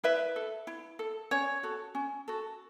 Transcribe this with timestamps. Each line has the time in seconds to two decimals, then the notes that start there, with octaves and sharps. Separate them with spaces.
0.04 E4 B4 E5
0.36 A4
0.67 E4
0.99 A4
1.31 C#4 C#5
1.63 F#4 A4
1.95 C#4
2.28 F#4 A4